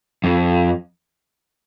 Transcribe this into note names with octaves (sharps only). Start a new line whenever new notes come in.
F2